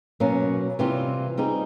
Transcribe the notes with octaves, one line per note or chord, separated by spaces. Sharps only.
B2 F#3 A#3 C#4
C3 E3 G3 C4 F4
G3 C4 D#4 G#4